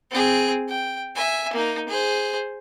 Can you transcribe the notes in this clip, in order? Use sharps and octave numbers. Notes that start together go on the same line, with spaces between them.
C4 G#4
G5
E5 G#5
A#3 D#4
G#4 C5